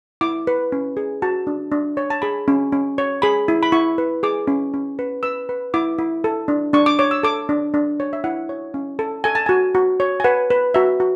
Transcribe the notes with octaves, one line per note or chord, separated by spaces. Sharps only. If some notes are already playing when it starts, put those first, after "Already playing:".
E4 D6
B4
C#4
G#4
F#4 A5
D4
D4
C#5
A5
G#4 B5
C#4
C#4
C#5
G#4 B5
E4
B5
E4 C#6
B4
G#4 D6
C#4
C#4
B4
B4 E6
B4
E4 D6
E4
A4
D4
D4 C#6
D6
C#5 D6
E6
A4 D6
D4
D4
C#5
E5
E4 F#5
C#5
C#4
A4
A4 G#5
A5
F#4 G#5
F#4
C#5
G#5
B4 F#5
B4
F#4 E5
F#4